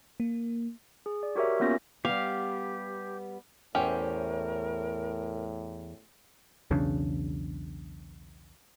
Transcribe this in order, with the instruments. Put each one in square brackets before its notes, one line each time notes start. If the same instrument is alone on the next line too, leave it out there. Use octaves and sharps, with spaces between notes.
[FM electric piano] A#3
[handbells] G#4
D5
F#4 G4 A#4 C#5 E5
A#3 B3 C#4 F4 A#6
[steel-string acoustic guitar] G3 B3 [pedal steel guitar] G4 [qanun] F5
[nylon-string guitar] E2 C5 E5 [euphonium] A2 [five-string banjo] C#4 G4 [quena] A#4
[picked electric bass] B1 E2 C#3 D4